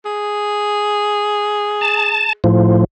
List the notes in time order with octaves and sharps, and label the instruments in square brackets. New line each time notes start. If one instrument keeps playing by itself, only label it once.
[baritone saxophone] G#4
[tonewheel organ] A5
A2 F3